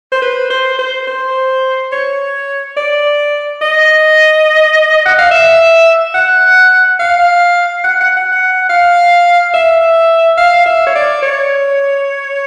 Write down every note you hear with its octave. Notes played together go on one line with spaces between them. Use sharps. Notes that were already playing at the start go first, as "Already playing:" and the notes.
C5
B4
C5
C5
C5
C#5
D5
D#5
F#5
F5
E5
F#5
F5
F#5
F#5
F#5
F#5
F5
E5
F5
E5
C#5
D5
C#5